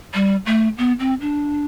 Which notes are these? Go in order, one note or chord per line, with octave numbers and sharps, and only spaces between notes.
G3
A3
B3
C4
D4